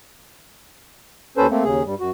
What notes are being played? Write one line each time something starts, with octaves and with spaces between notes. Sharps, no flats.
D#2 C#4 A4 B4 C5
A3 A#3 C4
D#2 C#3 G#4
G2 G3
F#2 F#4